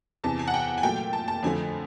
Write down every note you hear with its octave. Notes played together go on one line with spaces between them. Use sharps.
E2 C3 E3 A5
G#5
F#5
G5
G#5
A#2 F#3 A3 G5
A5
A5
F2 D3 F3 A3 G#5